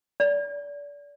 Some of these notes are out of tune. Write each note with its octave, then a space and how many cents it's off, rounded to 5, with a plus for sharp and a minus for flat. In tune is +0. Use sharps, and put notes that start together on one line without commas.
D5 -30